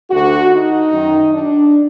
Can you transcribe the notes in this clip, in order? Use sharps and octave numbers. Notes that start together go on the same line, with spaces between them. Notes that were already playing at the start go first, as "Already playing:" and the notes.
D2 D3 F#4
D#4
F#2 D#3
D4